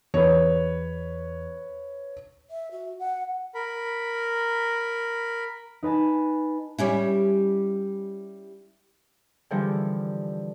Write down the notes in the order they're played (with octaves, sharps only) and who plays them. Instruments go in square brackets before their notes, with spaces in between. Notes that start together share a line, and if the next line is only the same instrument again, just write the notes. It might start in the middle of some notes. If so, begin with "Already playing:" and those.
[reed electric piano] E2 [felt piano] B4 C#5
[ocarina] E5
F#4
F#5
[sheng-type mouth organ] A#4 B5
[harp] D#4 B4 G#5 A5
[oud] G3 C#4 E4
[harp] D3 E3 F3 G3 G#4